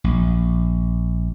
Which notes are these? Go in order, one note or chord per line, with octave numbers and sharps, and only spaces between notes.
A#1